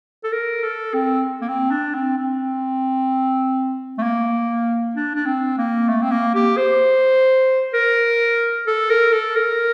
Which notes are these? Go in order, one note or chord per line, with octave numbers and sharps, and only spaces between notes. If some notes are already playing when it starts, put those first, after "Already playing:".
A4
A#4
A4
C4
A#3
C4
D4
C4
C4
A3
A#3
D4
D4
C4
A#3
A3
C4
A#3
G4
C5
A#4
A4
A#4
A4
A#4